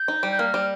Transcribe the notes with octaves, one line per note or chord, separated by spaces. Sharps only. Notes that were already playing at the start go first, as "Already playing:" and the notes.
Already playing: G6
D#4
G3
G6
A#3 F6
G3